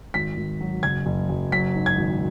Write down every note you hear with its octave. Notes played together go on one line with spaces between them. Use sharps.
G#1 B6
G#1
F#3
F#1 G#6
F#1
F#1
F#3 B6
G#2
G#6
G#1